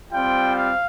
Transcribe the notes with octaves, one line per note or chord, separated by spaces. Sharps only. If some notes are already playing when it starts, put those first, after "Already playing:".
G3 C4 F4 G5
F5